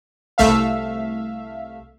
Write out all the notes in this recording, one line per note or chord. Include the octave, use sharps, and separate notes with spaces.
C2 A3 E5 F5